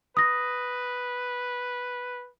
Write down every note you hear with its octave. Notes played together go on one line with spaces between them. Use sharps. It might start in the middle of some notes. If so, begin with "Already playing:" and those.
B4 D#6 A#6